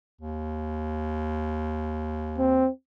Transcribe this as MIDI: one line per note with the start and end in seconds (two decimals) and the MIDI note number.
0.21 2.67 39
2.38 2.69 60